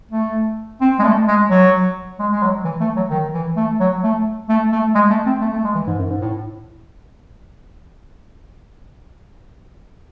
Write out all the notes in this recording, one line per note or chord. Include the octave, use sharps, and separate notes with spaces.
A3
C4
G#3
A3
G#3
F#3
G#3
G#3
F#3
E3
A3
F#3
D#3
E3
A3
F#3
A3
A3
A3
G#3
A3
C4
A3
A3
G#3
E3
G#2
F#2
G#2
A2